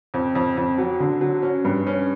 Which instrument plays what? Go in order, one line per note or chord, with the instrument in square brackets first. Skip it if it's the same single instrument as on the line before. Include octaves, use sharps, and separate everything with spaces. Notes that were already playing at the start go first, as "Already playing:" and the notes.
[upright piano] F2
F2
F2
F#3
D3
F#3
C#4
G2
C#4